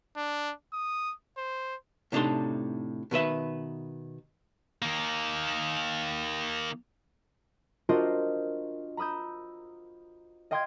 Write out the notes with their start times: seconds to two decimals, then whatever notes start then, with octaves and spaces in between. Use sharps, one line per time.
0.17 D4
0.73 D#6
1.37 C5
2.12 A2 C3 D4 D#4 A4 C6
3.11 B2 D#3 B4 E5
4.82 D#3 A#3
7.89 D4 F4 F#4 A#4 C5 D#5
8.97 A#5 B5 D#6 E6 G6
10.51 D#5 F5 G5 C6 D#6 G#6